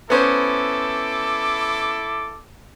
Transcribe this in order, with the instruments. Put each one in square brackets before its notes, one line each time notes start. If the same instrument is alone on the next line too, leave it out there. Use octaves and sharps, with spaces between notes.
[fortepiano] B3 C#4 C5 [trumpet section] E4 A4 D6